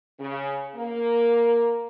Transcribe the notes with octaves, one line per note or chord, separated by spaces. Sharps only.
C#3
A#3